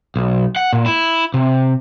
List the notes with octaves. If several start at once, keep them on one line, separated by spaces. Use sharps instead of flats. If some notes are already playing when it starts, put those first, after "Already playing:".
B1
F#5
A#2
E4
C3